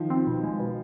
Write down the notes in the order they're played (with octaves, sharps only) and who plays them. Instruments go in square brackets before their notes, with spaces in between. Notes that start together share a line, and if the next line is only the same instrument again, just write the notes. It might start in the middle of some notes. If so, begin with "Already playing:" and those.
Already playing: [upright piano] D#3 F3
[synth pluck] C4
B2
G#3
B2